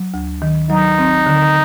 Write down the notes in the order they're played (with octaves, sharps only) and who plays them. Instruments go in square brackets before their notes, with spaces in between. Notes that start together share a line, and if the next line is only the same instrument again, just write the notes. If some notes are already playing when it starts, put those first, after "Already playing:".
Already playing: [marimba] F#3
D2
D#3
[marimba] F#3 [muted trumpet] D#4
[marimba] C4
D3